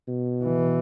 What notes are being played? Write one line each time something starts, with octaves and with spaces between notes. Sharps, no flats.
B2
E3